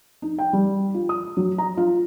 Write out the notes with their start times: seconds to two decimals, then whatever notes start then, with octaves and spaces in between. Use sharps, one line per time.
0.22 D#4
0.39 G5
0.53 G3
0.94 F4
1.09 D#6
1.37 F#3
1.58 A#5
1.77 F4